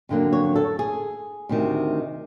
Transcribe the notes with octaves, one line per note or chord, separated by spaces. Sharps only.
F2 D3 F#3 A#3
C#5
A4
G#4
D2 C3 D#3